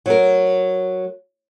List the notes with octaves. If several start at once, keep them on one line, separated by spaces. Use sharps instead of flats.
F#3 A#4